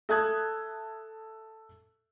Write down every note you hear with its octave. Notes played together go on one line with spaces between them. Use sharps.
A4 E5 A5 D#6 F#6 G#6